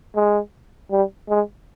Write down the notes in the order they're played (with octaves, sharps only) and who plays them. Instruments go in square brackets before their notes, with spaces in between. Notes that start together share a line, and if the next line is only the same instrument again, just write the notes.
[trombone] G#3
G3
G#3